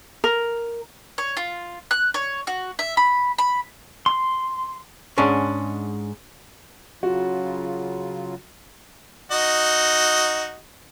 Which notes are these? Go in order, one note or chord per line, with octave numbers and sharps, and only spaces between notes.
A#4
C#5
F4
F#6
C#5
F#4
E5
B5
B5
C6
G#2 G#3 C#4 D4
C#3 F#3 F4 F#4
D#4 F#4 D#5